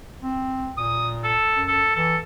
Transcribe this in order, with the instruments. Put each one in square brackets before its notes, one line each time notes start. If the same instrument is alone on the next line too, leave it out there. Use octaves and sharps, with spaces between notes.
[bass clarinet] C4
[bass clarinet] A#2 [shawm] D#6
[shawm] A4
[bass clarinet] F#2
[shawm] A4
[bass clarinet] E3 [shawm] A4